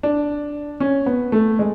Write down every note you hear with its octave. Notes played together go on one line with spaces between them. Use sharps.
D4
C#4
B3
A3
G#3